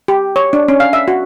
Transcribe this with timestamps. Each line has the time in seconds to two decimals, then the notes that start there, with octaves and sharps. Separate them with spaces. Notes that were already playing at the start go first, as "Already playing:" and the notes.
0.08 G4
0.36 C#5
0.53 D4
0.68 C#4
0.80 F5
0.93 E5
1.08 F#4